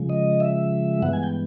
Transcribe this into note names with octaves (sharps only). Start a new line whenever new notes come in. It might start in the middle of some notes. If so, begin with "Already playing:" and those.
Already playing: C#3 F3 G#3
D#5
E5
G2 E3 G#3 B3 F#5
G#5
G5